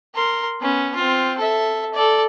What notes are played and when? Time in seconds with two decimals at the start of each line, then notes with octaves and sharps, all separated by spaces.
0.15 A#4 C6
0.61 B3 C#4
0.95 C4 F4
1.38 A4 E5
1.94 A4 D5